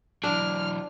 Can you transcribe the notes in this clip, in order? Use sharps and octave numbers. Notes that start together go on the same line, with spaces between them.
E3 F#3 D4 F6